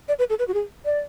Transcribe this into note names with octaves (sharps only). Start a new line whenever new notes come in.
D5
B4
A4
B4
F#4
G#4
D5